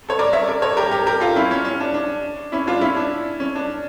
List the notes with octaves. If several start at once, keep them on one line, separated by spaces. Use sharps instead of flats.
A4 C#5
A#4 D5
C#5 E5
A#4 D5
A4 C#5
G4 A#4
G4 A#4
G4 A#4
F4 A4
C#4 E4
C#4
C#4
D4
D4
C#4 E4
D4 F4
C#4 E4
D4
C#4
D4